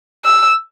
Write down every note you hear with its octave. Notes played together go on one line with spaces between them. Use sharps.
E6